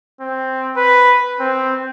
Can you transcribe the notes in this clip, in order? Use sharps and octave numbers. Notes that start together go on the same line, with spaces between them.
C4
B4
C4